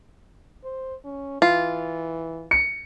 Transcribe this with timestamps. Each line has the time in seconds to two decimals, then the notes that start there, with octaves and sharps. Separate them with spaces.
0.64 C5
1.05 C#4
1.42 E3 F4
2.51 C#7